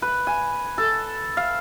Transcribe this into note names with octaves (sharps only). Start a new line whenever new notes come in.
B4
G#5
A4
F5